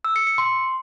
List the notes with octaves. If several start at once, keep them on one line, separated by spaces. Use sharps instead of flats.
E6
C#7
C#7
C6